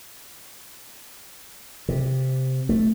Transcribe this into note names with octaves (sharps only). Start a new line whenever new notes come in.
C3
A3